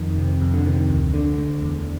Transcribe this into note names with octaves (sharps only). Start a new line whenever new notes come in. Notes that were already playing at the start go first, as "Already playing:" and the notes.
Already playing: F2 D#3
C3
F2
D3
C3 D#3
D2
D2 D3
D2
E2